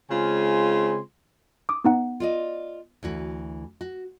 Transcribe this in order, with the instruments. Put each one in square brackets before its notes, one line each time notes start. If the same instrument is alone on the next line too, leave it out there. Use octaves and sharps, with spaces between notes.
[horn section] C#3 G#3 C4 F4 G#5 C6
[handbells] D6 D#6
B3 D#4 F#5
[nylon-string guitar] F4 D5 D#5
D2 E3 F#4
F#4